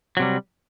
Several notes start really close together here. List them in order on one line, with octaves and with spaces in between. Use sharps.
F#3 C3 G3